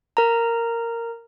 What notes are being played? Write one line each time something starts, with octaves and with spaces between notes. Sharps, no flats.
A#4 A#5